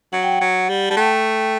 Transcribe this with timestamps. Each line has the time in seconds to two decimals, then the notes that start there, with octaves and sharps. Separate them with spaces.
0.13 F#3 F#5
0.23 G5
0.32 F#5
0.41 F#3
0.69 G3
0.90 G3 A5
0.96 A3 G5